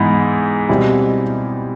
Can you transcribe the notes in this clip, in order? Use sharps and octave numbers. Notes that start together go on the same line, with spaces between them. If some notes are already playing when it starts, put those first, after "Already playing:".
Already playing: G#2 E3 B3 E4
B2 G3 C4 E4